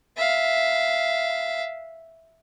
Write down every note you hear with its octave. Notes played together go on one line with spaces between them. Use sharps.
E5 F5